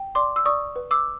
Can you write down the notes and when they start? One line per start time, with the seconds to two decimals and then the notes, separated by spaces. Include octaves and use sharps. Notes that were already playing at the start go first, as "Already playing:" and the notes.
Already playing: G5
0.15 D5 C6 D6
0.36 E6
0.46 D5 C#6 D#6
0.76 B4
0.91 D6 E6